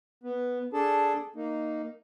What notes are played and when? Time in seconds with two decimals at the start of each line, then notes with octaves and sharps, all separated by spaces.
0.24 B3
0.73 D4 G#4 A4 A5
1.36 A#3 D#4